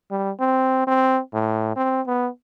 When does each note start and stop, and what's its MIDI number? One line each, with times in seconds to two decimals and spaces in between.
0.11 0.31 55
0.40 0.83 60
0.87 1.20 60
1.33 1.72 45
1.76 2.01 60
2.07 2.28 59